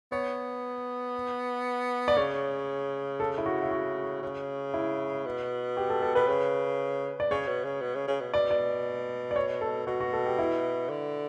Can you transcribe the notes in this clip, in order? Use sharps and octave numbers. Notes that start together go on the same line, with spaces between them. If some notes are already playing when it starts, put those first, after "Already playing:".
B3 C#5
D5
C#3 C#5
A4
E4
F#4
E4
F#4
C#3
E4
B2
G4
A4
A4
B2 B4
C#3
D5
C#3 C#5
B2
C#3
B2
C#3
C#3
B2
B2 D5
D5
D5
C#5
A4
B2 F#4
F#4
A4
G4
E4
D3